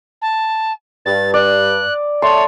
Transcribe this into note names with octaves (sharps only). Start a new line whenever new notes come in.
A5
G2 A6
D5 F#6
A3 C#5 E5 A5 C6